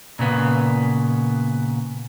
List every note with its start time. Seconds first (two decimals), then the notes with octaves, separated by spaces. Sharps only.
0.19 A#2 C#3 B3